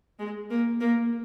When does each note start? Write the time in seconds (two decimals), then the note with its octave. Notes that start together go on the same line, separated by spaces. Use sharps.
0.19 G#3
0.50 A#3
0.81 A#3